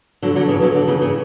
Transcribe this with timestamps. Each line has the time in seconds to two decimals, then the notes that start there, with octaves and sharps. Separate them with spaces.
0.22 D3 F#3
0.35 D3 F#3
0.48 C#3 E3
0.62 D3 F#3
0.74 D3 F#3
0.87 C#3 E3
1.01 C#3 E3